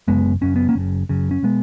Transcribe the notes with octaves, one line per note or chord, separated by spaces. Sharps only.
F#1 F#2 C#3 G#3 B3
F#1 F#2 C#3 C#4
B3
A#3 C#4
F#1 F#2 C#3
F#1 F#2 C#3
C#4
B2 G#3 B3